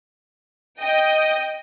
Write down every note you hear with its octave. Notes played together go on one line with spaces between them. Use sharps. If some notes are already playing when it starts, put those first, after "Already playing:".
D#5 G5